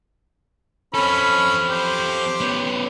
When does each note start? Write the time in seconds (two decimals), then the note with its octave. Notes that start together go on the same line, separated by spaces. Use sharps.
0.94 C4 C#4 A4 B5
1.69 G4 C5
2.41 B3 C#4